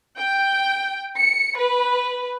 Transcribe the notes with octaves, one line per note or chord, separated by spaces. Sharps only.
G5
C#7
B4